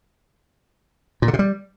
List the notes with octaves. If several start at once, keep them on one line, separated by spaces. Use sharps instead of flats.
A#2
D3
C3
G3